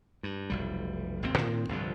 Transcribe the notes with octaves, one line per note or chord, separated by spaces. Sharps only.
G2
F1 B1 G3
G#1 D#2 D#3 C4
A2 D#3 C4
G1 C2 G2 F3